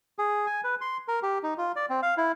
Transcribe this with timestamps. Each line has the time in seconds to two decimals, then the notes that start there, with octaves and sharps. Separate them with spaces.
0.19 G#4
0.47 G#5
0.64 B4
0.81 C6
1.08 A#4
1.23 G4
1.43 D#4
1.58 F4
1.76 D5
1.90 C4
2.03 F5
2.17 E4